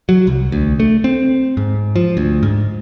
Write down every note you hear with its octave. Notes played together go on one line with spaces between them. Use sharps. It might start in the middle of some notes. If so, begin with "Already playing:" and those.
F#3
C2
D2
A3
C4
G#2
F3
D2
G#2